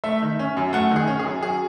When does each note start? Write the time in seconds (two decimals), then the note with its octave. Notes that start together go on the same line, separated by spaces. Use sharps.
0.04 A3 E5
0.22 D#3
0.39 C#4
0.57 F#2
0.73 A3 F#5
0.91 D#3 G#4
1.08 C#4
1.19 G#4
1.25 F#2
1.43 F#3 G#4